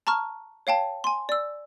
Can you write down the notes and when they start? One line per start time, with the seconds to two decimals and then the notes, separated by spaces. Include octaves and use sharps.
0.07 A5 A#5 C#6 F6
0.67 C#5 F5 G5 A5
1.04 G#5 C6
1.29 D5 E6